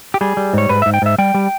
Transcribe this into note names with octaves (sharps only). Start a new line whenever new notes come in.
G4
G3 G#4
G3
G#2 C#5
G#2 B4
G#2 E5
G5
G#2 E5
G3 G5
G3